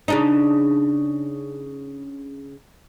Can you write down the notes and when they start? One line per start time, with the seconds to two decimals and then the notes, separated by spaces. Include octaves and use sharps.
0.08 C#3 D4 D#4